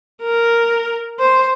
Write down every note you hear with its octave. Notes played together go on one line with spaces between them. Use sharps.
A#4
C5